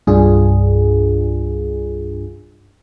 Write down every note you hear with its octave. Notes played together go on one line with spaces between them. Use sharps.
C2 G2 D4 F4 G#4